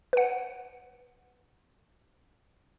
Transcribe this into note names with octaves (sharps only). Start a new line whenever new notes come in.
B4 F#5